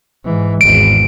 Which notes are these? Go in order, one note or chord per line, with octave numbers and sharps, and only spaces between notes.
G#2 E3
G#1 E2 D7